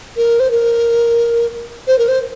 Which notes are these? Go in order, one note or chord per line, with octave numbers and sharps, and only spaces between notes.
A#4
C5
A#4
C5
A#4
C5